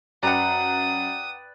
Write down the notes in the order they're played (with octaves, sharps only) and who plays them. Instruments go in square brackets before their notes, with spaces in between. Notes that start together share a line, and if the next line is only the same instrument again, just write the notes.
[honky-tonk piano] F#2 [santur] B4 D5 G5 [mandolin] F#5 A#5 [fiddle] D#6